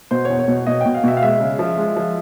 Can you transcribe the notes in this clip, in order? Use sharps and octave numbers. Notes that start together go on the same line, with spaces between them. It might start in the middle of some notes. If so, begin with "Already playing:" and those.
B2 C5
E2 C#5
C#5
B2
B2 D#5
B2 G5
F5
B2 E5
F5
G#3 E5
C#3
F3
G#3
F3